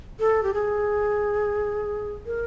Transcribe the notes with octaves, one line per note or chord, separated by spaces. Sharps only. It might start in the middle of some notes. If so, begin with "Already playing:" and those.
A4
G4
G#4
A#4